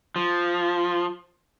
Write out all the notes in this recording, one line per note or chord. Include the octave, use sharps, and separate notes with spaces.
F3